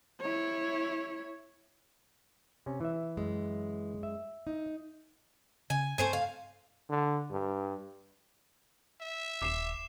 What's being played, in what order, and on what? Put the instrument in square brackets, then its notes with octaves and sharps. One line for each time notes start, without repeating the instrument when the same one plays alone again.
[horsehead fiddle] E4 C#5
[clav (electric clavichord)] C3 C#4
E3 E5
[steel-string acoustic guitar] F#2 G#3
[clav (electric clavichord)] E5
[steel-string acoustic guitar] D#4
[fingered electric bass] C#3 [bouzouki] G#5
[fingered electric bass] G2 C4 [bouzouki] A3 C5 G#5
[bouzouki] F5
[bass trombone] D3
G2
[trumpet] E5
[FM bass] D#1 [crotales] D6 C7 E7